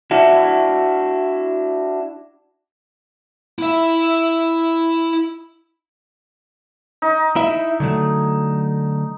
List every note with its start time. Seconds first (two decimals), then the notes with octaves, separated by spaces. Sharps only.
0.11 D4 E4 F#4
3.59 E4 E5
7.02 D#4
7.36 E4 E5
7.80 D3 F#3 A3